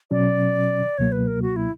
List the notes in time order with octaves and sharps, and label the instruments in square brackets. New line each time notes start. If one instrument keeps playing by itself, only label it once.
[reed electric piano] B2 F#3 C#4 [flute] D5
[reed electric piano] C#2 B2 F#3 A#3 [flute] C#5
[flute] B4
A#4
F#4
E4